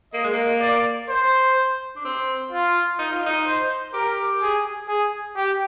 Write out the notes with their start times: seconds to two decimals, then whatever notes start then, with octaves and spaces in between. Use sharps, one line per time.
0.13 A#3 D#5
0.24 G#3
0.33 A#3
0.61 D5
1.10 C5
1.96 D4
2.05 C4
2.52 F4
2.99 D#4
3.12 F4
3.26 D#4
3.47 C5
3.94 G4 A#4
4.42 G#4
4.89 G#4
5.36 G4